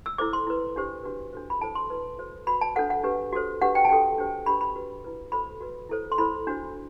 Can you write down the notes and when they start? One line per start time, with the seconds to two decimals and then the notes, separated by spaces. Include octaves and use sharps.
0.06 E6
0.18 E4 A4 C5 D6
0.33 C6
0.47 E4 B4
0.76 D4 G4 C5
1.04 D4 F#4 B4
1.33 D4 F#4 A4 C5
1.50 B5
1.61 E4 A4 C5 A5
1.75 C6
1.90 E4 B4
2.19 F#4 A4 C5
2.47 F#4 B4 B5
2.61 A5
2.75 D4 A4 C5 F#5
2.90 F#5
3.03 D4 G4 B4
3.33 F#4 A4 C5
3.62 D4 G4 B4 F#5
3.75 G5
3.85 A5
3.89 D4 F#4 A4 G5
4.18 D4 G4 C5
4.46 D4 G4 B4 B5
4.61 B5
4.75 F#4 B4
5.04 E4 B4
5.32 F#4 A4 C5 B5
5.61 F#4 B4
5.89 E4 A4 C5
6.12 C6
6.18 E4 A4 C5 B5
6.47 D4 F#4 C5